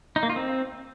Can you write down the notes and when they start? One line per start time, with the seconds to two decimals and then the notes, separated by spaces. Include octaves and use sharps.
0.16 D#4
0.23 A#3
0.29 F4
0.36 C4